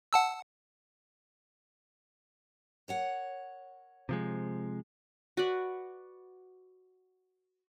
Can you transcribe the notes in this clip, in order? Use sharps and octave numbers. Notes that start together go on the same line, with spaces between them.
F#5 A5 E6
A#4 C#5 F#5
C3 F3 G#3
F#4 B4 D5